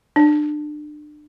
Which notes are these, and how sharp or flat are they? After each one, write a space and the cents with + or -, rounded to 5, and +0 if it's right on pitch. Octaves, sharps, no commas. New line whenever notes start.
D4 +30